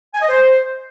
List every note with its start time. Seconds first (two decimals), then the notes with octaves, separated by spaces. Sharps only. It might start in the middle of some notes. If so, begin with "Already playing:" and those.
0.14 G#5
0.22 D#5
0.29 C5